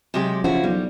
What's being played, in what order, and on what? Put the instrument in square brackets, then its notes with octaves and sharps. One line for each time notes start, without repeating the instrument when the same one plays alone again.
[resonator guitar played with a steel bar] C3 G#3 G4 [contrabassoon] F#3
[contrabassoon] C#3 [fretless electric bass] F3 [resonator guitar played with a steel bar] E4 F#4
[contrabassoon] B1 [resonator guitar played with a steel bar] G3